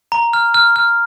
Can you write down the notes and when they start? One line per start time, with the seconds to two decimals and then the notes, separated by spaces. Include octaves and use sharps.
0.12 A#5
0.33 F6
0.54 F6
0.76 F6